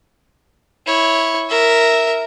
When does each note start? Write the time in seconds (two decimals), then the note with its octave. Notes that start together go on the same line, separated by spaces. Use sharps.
0.86 E4 C#5
1.50 A#4 E5